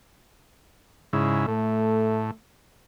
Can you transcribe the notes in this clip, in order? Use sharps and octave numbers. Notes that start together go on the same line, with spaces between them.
G#2 C#3 E4
A2 A3